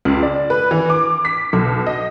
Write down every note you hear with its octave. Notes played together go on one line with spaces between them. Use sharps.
C#2
D5
B4
E3
D6
B6
B1
D#5